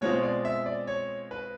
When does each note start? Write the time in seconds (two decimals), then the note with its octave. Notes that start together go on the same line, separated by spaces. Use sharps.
0.01 B2 G#3 C4 F4 C#5
0.23 D5
0.45 E5
0.66 D5
0.87 C#5
1.31 B4